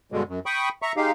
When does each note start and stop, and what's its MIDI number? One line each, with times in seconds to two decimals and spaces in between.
0.12 0.23 43
0.12 0.23 47
0.12 0.23 50
0.12 0.23 56
0.28 0.39 42
0.46 0.69 79
0.46 0.69 83
0.46 0.69 85
0.46 0.69 87
0.82 0.92 76
0.82 0.92 82
0.82 0.92 85
0.97 1.11 56
0.97 1.11 63
0.97 1.11 67
0.97 1.11 77